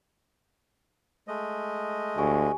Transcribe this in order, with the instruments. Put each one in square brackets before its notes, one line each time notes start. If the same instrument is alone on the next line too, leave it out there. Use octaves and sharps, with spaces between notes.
[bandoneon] G#3 A3 D#5
[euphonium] D2 [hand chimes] G4 G#5 C#6